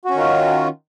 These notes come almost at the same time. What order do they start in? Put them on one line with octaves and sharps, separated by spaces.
F#4 C#4 D#3 F4